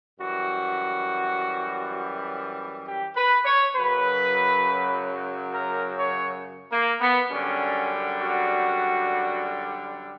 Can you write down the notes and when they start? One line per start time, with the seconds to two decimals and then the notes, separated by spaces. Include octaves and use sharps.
0.20 F#2 E3 G3 F#4
2.87 G4
3.16 B4
3.45 C#5
3.75 F#2 C#3 F#3 B4
5.53 A#4
5.98 C#5
6.71 A#3
7.01 B3
7.30 F#2 D3 G3 C#4
8.19 F#4